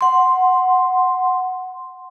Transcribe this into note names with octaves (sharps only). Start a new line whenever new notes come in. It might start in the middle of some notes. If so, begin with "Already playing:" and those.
F#5 C6